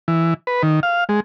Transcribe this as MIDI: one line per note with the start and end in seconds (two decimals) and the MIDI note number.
0.08 0.34 52
0.47 0.62 71
0.63 0.80 51
0.83 1.04 77
1.09 1.20 56